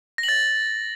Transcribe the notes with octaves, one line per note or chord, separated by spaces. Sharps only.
A#6
F#7
A6